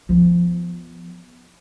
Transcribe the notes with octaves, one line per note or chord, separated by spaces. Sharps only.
F3 B3